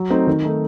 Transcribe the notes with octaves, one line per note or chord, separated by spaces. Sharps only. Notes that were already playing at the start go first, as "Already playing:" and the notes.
Already playing: F#3
A3 C4 D#4
D#3
A3 D#4